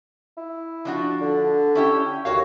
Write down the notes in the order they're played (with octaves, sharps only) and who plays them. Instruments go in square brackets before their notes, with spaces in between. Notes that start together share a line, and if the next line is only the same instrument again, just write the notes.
[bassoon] E4
[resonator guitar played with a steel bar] F3 D4 F#4
[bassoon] D3
[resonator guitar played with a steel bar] C#4 E4 G4
[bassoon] D#2 [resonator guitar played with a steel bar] F#4 C#5 F5